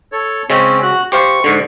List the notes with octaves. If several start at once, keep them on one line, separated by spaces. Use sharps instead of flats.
A4 C#5
C#3 G#3 C4 C#4
F#4 F#6
G4 C5 F5 C#6
G#2 D3